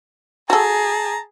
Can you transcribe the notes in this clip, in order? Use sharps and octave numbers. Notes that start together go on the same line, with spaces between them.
F#4 G#4 A4 A5 A#5